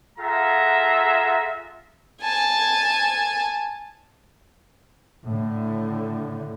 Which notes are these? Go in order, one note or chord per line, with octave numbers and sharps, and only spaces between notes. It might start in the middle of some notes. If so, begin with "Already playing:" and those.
F4 G#4 A4 E5 F#5 A#5
G#5 A5
A2 D3